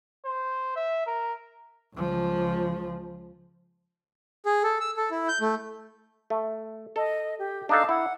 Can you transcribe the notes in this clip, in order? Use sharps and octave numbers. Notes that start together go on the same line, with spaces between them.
C5
E5
A#4
C#2 F3
G#4
A4
E6
A4
E4
G6
A3
A3
A4 D#5
G4
D4 D#4 A4 D#5 F5 A5
E4 F#5